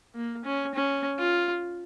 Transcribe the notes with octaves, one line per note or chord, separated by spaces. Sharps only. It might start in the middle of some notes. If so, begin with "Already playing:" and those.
A#3
C#4
C#4
F4